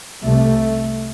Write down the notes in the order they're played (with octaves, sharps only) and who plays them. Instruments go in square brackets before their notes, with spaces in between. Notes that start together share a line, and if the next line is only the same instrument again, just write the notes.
[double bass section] C2 C3 A3